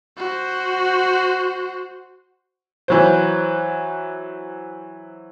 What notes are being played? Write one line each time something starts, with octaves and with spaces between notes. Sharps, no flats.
F#4 C5
E3 F#3 C5